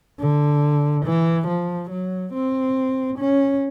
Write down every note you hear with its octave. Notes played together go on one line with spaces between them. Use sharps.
D3
E3
F3
F#3
C4
C#4